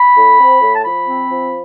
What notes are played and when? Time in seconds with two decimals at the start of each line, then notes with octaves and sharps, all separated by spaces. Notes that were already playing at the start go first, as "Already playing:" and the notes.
Already playing: B5
0.16 A2
0.38 C4
0.60 A2
0.74 A5
0.83 F3 B5
1.06 C4
1.28 F3